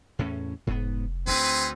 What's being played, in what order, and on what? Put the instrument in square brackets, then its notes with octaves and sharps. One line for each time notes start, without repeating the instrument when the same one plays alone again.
[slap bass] E2 A2 C#4
[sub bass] F1 [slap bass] G#2 B3
[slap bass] D2 [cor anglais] C4 [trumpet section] D#4 G#4 B4